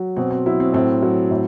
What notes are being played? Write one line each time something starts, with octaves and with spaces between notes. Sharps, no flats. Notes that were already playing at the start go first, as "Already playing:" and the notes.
Already playing: F#3
B2 C4
C4
F#3 E4
C4
A2 C4
F#3
A2